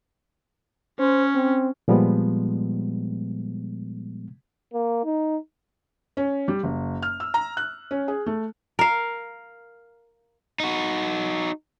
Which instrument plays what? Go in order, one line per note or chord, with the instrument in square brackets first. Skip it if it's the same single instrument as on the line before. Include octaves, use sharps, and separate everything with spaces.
[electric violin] C#4 [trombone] C5
[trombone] C4
[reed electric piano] A#2 F3 G3 G#3 B3
[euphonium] A#3
D#4
[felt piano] C#4
G3
F#1
F6
E6
A#5
F#6
C#4
G#4
A3
[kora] A#4 F5
[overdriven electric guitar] D#4 F#4